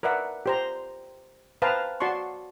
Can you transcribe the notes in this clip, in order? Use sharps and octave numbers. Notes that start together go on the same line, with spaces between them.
A#4 B4 D5 E5 F#5
G4 C5 A#5
B4 C5 F5 G5 A5 A#5
F#4 D5 A5 C6 C#6